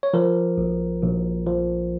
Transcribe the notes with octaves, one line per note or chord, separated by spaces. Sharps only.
C#5
F3 A#4
A#1
A#1
F3